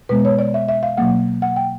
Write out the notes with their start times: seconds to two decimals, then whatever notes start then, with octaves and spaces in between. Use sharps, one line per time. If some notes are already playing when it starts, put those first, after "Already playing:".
0.09 B2 G#3 B3 B4
0.25 C#5
0.39 D5
0.54 E5
0.68 E5
0.83 F5
0.97 B2 F#3 A#3 F#5
1.42 F#5
1.56 G5